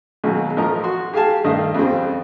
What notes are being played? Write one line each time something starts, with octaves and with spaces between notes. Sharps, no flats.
D#2 B2 F#3 G#3
A1 F3 A#4 D#5 A#5
F#4 C6
G4 G#4 F5 G#5 A5
G2 D#3 A3 D#5 F5
F2 C#3 F3 G3 G#3 C4